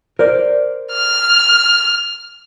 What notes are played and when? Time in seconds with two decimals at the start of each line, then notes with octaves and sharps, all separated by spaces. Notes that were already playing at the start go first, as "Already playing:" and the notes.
0.19 A#4 C5 D5
0.93 F6